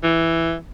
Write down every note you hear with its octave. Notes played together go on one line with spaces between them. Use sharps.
E3